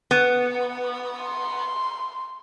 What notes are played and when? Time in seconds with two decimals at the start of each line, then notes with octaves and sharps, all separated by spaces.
0.11 B3
1.24 C6